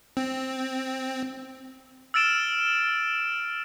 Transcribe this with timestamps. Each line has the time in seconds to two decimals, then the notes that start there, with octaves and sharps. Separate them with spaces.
0.17 C4
2.14 E6 F6 A6 D7 E7